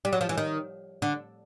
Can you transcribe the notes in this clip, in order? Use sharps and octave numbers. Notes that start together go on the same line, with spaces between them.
G3
F#3
F3
E3
D#3
D3